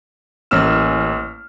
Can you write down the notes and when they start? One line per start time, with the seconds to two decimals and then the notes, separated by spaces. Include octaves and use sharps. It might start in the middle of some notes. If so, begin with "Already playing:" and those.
0.51 A1 A#3 C#4 E6 F6 E7